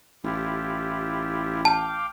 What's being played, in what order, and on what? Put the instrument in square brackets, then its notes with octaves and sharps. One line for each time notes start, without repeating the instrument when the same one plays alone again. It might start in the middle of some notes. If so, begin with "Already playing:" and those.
[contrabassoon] A1 [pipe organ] E4 F4 G4
[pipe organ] F5 G5 D6 [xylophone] A5